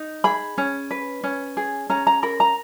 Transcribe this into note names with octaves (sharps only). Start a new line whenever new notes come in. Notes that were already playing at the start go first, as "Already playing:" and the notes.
Already playing: D#4
G#4 B5
C#4
B4
C#4
G#4
C#4 A#5
A#5
A#4 B5
A#5